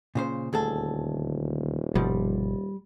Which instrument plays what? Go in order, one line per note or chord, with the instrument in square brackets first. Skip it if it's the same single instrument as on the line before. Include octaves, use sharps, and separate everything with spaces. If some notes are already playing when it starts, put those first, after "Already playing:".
[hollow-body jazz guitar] A#2 C#3 C5
[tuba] D#1 [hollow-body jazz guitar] D2 G#4 A4
[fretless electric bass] G1 B2 F3 [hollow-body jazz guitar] G3